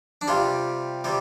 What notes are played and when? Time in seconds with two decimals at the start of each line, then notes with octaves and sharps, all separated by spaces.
0.21 D4
0.28 C3 G3 F4
1.04 C3 G3